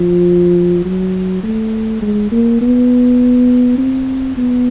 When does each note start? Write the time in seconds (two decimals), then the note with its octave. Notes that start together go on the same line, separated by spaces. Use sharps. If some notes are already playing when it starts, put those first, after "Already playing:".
Already playing: F3
0.85 F#3
1.43 A3
2.02 G#3
2.31 A#3
2.61 B3
3.78 C4
4.37 B3